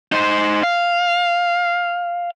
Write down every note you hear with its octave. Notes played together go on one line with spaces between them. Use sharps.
D#4 C5
F5